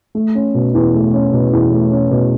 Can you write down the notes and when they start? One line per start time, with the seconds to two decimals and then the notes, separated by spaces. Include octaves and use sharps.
0.15 A3
0.35 C#4
0.55 B2
0.74 E2
0.93 A3
1.13 C#4
1.32 B2
1.53 E2
1.72 A3
1.91 C#4
2.11 B2